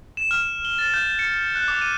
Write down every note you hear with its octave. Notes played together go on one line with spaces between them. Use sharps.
E7
F6
G7
A6
G6
C#7
F#6
D6
D#7